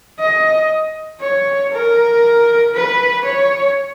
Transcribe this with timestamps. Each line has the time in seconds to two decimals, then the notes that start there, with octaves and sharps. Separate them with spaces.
0.20 D#5
1.21 C#5
1.73 A#4
2.75 B4
3.25 C#5